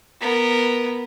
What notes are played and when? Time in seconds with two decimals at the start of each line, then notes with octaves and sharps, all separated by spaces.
0.21 B3 A#4